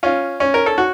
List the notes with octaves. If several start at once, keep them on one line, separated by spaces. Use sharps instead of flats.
C#4 F4
C#4
A#4
A4
F#4